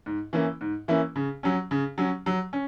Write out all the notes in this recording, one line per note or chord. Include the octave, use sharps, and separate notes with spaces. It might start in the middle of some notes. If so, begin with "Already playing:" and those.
G#2
E3 A#3 C#4 E4
G#2
E3 A#3 C#4 E4
C#3
F#3 C#4
C#3
F#3 C#4
F#3
C#4